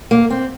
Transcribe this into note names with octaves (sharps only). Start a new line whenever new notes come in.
A#3
C4